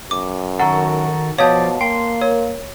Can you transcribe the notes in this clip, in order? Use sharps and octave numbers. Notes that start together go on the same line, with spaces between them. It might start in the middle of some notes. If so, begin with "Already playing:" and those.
F#2 D6
D#3 F#4 A4 F#5 A#5 C#6
B2 F3 C#5 D5 F5 A5 D#6 G6
A#3 G5 C6
A#4 C#5